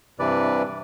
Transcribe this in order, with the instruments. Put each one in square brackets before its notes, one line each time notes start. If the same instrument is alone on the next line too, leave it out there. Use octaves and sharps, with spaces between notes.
[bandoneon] G2 C3 E3 B4 D5